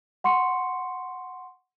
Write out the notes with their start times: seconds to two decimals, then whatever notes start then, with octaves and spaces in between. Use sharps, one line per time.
0.24 F#5 C6 C#6 C#7